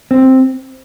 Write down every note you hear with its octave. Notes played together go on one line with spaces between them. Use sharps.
C4